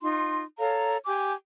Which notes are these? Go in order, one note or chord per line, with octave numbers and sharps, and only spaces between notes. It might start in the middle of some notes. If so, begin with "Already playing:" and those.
D#4 F4 C6
A4 C#5 F5 A#5
G4 G#5 D6